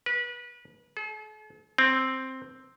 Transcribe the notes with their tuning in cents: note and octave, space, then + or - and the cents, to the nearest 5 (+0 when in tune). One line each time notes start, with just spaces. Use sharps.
B4 -30
A4 -45
C4 +5